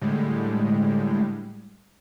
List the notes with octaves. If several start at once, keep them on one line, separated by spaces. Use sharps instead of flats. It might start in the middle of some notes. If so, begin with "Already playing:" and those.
A2 D3 G3 G#3